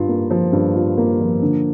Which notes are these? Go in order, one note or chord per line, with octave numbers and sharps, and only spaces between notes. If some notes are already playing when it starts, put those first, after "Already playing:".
Already playing: G2 F4
A#3
F3
G2
F4
A#3
F3
D3